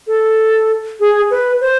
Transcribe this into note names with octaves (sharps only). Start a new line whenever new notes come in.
A4
G#4
B4
C5